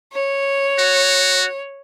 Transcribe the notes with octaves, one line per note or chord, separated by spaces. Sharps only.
C#5
F#4